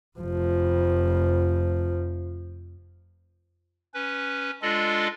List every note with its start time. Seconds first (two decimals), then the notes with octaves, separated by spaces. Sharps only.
0.20 F1 F3
3.94 C#4 B4
4.62 G#3 D4 F4 A4 D5 D#5